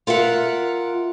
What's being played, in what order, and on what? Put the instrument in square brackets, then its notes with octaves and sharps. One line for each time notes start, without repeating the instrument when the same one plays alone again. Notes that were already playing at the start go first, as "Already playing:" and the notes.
[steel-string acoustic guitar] F4 A#4 E5 F#5